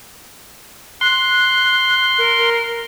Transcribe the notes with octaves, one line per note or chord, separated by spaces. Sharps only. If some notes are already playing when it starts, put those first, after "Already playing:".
C6 F#6
A#4